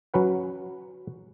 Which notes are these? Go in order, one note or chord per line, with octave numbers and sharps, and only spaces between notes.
F#3 C#4 B4 F#5